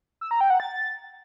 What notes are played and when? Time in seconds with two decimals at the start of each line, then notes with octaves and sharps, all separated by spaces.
0.21 E6
0.31 A#5
0.41 G5
0.50 F#5
0.60 A6